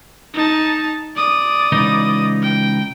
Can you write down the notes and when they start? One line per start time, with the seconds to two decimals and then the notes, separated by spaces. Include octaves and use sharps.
0.34 D#4 A5
1.16 D5 D#6
1.72 C#2 E3 D#4
2.43 G5